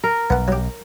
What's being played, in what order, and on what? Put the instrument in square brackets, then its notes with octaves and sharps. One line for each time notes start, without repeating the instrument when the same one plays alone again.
[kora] A#4
[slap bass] B1 [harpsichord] B3 F#5
[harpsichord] F#3 G4